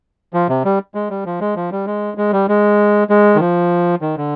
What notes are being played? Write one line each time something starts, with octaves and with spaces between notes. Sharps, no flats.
F3
C3
G3
G#3
G3
F3
G#3
F3
G3
G#3
G#3
G3
G#3
G#3
D#3
F3
D#3
D3